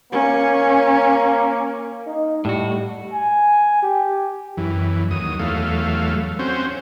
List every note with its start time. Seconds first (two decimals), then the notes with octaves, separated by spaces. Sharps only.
0.12 A#3 C#4
2.07 D#4
2.45 A2 G3 F#4
3.12 G#5
3.83 G4
4.57 F#2 E3
5.11 D#2 F#3 D#6
5.39 E2 F#3 A3 F5
6.39 C4 C#4 F#4 C5